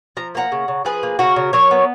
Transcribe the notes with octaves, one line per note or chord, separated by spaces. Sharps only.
F3 A#5
A#3 F#5 A#5
C#3
C#3
F3 G#4 B4
A#3
C#3 F#4 A#4
C#3
F#3 A#4 C#5
B3